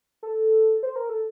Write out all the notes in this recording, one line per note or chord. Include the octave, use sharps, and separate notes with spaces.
A4
C5
A#4
A4